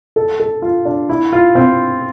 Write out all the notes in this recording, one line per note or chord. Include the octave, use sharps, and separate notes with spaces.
A4
A4
F4
D4
E4
F4
C4